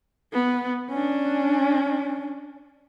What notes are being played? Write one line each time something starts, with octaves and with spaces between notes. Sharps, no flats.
B3
C#4 D4